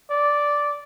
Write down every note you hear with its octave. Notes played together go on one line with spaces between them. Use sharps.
D5